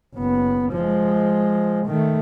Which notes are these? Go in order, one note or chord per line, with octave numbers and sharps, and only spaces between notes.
F#1 B3
F3 G#3
D#3 A3